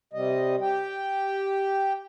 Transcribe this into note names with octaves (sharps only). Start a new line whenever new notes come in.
C3 G3 D#5
G4 G5